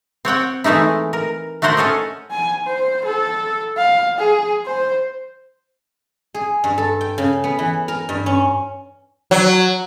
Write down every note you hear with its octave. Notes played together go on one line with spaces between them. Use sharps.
C4 C#5 F#5 G5
E3 G#3 A3 D#4 E4
A#4
A3 F#4 A#4 C5 F#5
C#4 A4 C#5 D#5
G#5
C5
A4
F5
G#4
C5
G#4
G2
A4
G5
C#3
B3
E3
A#4
G2
C#4
F#3